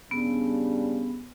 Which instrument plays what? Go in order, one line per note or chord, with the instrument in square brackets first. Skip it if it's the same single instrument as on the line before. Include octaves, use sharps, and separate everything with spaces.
[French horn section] G2 C#3 G3 [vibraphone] B3